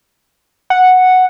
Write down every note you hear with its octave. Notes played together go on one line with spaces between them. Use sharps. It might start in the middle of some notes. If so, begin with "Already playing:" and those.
F#5